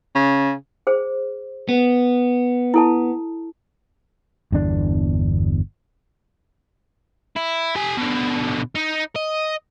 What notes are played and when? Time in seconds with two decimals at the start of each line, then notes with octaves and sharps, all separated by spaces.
0.15 C#3
0.87 G#4 C5
1.69 B3
2.74 E4 A4 A5
4.52 G1 E2 D4
7.36 E4
7.76 G4 G#5
7.98 B2 D3
8.75 D#4
9.16 D#5